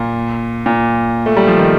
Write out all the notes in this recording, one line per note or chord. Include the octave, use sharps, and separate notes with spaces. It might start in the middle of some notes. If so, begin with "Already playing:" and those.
Already playing: A#2
A#2
A3
G3
F3
D#3